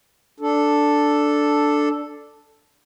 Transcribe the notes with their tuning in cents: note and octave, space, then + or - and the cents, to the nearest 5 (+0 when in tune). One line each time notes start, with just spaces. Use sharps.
D4 +0 A4 +0